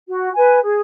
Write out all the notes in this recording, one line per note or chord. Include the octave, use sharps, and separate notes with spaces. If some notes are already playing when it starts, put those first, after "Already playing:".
F#4
B4 G#5
G#4